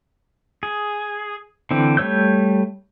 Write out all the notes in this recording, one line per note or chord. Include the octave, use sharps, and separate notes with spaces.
G#4
D3 E3 C4
G3 A3 C#5 E6 G6